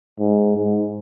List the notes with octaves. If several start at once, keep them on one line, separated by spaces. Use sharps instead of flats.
G#2
G#2